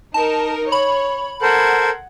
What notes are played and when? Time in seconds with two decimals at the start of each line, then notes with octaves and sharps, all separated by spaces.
0.14 D#4 A#4 A5
0.72 C#5 B5
1.42 A4 A#4 C5 F#5 G#6